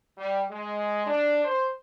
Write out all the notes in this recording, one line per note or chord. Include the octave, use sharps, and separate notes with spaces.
G3
G#3
D4
C5